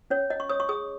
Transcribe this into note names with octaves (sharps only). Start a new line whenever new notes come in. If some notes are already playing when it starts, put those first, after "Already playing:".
C#4 C#5
C#5 D#5
C#6
C#5 D#6
C#6
G#4 D#6